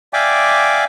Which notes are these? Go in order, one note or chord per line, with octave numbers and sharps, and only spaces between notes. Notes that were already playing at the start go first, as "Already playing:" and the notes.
D5 E5 F5 G5 G#5 D6